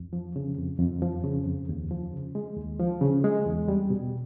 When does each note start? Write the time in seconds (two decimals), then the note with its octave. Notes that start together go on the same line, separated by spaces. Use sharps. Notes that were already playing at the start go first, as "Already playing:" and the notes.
Already playing: F2
0.13 F3
0.36 C#3
0.58 F2
0.79 F2
1.02 F3
1.24 C#3
1.46 F2
1.69 D#2
1.91 F3
2.13 C#3
2.35 G#3
2.57 D#2
2.79 F3
3.01 C#3
3.24 G#3
3.46 E2
3.68 G3
3.90 B2